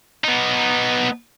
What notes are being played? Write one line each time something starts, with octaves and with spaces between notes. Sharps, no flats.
B3 D#4